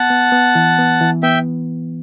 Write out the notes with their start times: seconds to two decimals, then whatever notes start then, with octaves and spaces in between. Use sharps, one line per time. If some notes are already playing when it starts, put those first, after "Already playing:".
Already playing: B3 F#5 A5
0.10 B3
0.32 B3
0.55 E3
0.78 B3
1.01 E3
1.23 B3 E5 G5